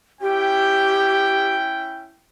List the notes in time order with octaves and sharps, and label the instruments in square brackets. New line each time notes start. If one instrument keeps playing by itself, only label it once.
[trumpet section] C#4 E4 G5 [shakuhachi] G4